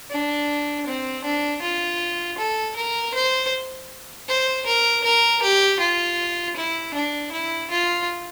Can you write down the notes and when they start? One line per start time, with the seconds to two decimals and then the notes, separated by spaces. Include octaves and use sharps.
0.10 D4
0.87 C4
1.24 D4
1.62 F4
2.38 A4
2.77 A#4
3.14 C5
4.29 C5
4.66 A#4
5.04 A#4
5.43 G4
5.80 F4
6.57 E4
6.94 D4
7.32 E4
7.71 F4